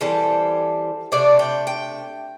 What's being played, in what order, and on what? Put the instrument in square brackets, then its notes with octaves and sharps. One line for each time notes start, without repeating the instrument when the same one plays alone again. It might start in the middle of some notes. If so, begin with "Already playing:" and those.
[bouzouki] E3 G3 C4 A4
C3 A3 D4 D5
G5
G5